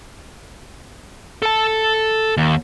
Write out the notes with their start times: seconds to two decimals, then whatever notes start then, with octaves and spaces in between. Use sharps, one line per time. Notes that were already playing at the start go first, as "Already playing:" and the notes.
1.42 A4 A5
2.37 D#2